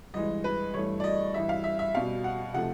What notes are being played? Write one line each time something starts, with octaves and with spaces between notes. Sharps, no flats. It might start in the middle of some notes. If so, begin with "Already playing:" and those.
G2 E3 G#3 D#5
B4
G2 E3 A3 C#5
D5
D#5
G2 E3 G3 E5
F5
E5
E5
B2 G3 F5
F#5
C3 F3 A3 F#5